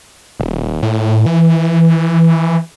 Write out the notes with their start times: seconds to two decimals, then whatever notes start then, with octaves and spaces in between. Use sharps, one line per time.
0.40 D#1
0.83 A2
1.26 E3